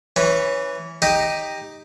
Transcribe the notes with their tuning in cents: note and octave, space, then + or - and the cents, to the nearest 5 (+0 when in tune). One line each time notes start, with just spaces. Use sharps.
E3 -5 C#4 +0
D#4 +0 G4 +10 D#5 +0